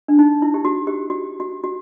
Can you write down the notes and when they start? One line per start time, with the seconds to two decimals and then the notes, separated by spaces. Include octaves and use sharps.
0.08 D4
0.19 D#4
0.42 E4
0.54 G4
0.65 F#4
0.87 G4
1.10 F#4
1.40 F#4
1.64 F#4